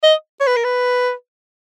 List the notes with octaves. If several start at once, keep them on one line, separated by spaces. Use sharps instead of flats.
D#5
C#5
B4
A#4
B4